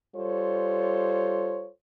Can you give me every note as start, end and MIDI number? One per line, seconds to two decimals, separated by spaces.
0.16 1.69 55
0.16 1.69 65
0.16 1.69 69
0.16 1.69 72
0.16 1.69 73